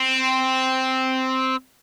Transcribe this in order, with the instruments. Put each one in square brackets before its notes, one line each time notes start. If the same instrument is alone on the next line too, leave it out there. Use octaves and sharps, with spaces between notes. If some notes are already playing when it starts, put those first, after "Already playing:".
Already playing: [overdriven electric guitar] C4